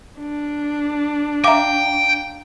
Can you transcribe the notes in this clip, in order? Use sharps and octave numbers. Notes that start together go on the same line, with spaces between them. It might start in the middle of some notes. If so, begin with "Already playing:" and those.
D4
E5 F5 G5 A#5 D6